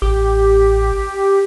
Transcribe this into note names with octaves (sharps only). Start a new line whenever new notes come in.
A1 G4